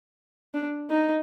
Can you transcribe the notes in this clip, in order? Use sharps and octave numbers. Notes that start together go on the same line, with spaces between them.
D4
D#4